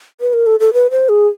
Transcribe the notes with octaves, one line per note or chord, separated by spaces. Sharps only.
B4
A#4
A4
A4
B4
C5
G#4